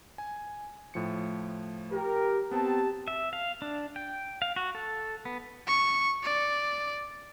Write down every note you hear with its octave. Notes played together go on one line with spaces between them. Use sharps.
G#5
A2 F3 C#7
G4 A#4
B3 C4 G4 A5
E5
F5
D4
G5
F5
F#4
A4
B3
C#6
D5